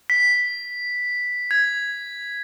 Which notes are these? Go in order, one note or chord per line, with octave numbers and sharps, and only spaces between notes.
B6
G#6